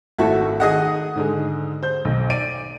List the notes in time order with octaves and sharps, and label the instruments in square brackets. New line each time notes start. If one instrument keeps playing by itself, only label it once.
[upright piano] G#1 A3 [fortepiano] E4 F#4 A4
[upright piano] D#3 D#6 [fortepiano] G#4 D#5 F#5
[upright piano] G#2 D3 G#3
C5 G6
B1
[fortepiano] D5 [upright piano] D7 D#7